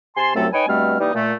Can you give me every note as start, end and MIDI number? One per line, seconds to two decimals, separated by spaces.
0.17 0.33 48
0.17 0.33 80
0.17 0.33 81
0.17 0.33 84
0.35 0.48 36
0.35 0.48 42
0.35 0.48 54
0.35 0.48 57
0.35 0.48 60
0.35 0.48 69
0.52 0.66 63
0.52 0.66 71
0.52 0.66 73
0.52 0.66 79
0.52 0.66 80
0.68 0.97 43
0.68 0.97 47
0.68 0.97 55
0.68 0.97 57
0.68 0.97 60
0.68 0.97 89
1.00 1.11 52
1.00 1.11 55
1.00 1.11 58
1.00 1.11 63
1.14 1.33 46
1.14 1.33 57